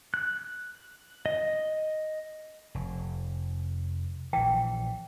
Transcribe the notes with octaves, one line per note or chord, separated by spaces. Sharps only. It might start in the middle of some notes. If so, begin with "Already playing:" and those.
F#6
D#5
F1
A#1 E3 G5